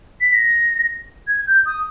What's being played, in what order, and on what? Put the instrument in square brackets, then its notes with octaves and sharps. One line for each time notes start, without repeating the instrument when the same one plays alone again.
[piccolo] B6
A#6
G#6
G6
D#6